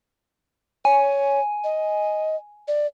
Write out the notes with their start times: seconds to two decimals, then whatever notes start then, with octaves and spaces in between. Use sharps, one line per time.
0.85 C#5 G#5
1.64 D#5
2.68 D5